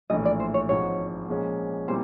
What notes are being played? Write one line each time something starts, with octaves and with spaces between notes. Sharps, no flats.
A#1 A2 E3 A3 D#5
D5
C5
C#5
G#1 G#2 F3 C#5
A#2 F3 G#3 C#4
A#2 G3 C4 E4 C5